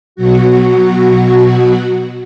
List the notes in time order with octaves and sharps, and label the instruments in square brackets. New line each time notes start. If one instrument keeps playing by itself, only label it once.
[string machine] B2 F#3 F#4